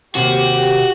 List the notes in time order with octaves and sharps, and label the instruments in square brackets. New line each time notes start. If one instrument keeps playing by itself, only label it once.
[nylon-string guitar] D#2 C3 [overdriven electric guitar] F#4 [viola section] G4